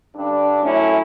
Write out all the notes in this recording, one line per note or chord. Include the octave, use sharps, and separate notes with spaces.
G2 D3 D4
F#2 A2 A3 C#4 E4